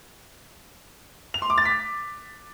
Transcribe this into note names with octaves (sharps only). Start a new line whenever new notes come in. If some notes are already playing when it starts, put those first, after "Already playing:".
F7
C6
D6
A6
B6